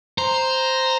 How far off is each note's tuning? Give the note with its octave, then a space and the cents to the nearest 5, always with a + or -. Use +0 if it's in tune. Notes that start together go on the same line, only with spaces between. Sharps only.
C5 +0 A#5 +0